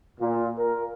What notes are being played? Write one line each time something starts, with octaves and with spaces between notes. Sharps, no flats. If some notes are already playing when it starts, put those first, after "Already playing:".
A#2
A#4